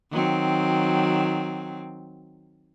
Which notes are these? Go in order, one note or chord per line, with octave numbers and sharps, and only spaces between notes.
D#3 F#3 C4